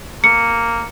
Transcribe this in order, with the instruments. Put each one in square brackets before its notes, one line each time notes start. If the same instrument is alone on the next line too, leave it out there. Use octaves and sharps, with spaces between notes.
[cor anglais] A#3 [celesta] C#7